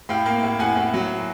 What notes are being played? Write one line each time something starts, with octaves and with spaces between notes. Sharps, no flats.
A2 F5 G5
A#3
A2
A2 F#5 G#5
A2
F#3